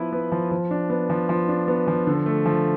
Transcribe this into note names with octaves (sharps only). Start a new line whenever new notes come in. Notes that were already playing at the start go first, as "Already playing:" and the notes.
Already playing: F3 B3 E4 B4
B3
F3
F3
D4
B3
F3
F3
D4
B3
F3
D3
A3
F3